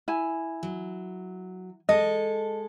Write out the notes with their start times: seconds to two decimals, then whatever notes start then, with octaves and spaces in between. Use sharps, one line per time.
0.08 E4 G#5
0.63 F#3
1.89 G#3 A4 D#5